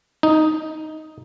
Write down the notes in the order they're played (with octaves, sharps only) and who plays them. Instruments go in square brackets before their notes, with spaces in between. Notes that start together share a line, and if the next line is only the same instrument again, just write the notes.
[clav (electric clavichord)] D#4